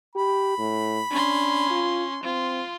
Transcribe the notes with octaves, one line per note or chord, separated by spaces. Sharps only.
G4 B5
A2
C#4 D4 C6
F4
C4 F4 C6